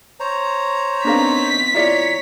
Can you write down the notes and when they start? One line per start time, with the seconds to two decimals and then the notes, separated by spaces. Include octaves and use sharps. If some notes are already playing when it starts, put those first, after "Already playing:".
0.20 C5 C#5 A#5
1.05 B3 C4 D4 D#4 A#4 F5 B6
1.74 E4 F4 C#5 D5 A#5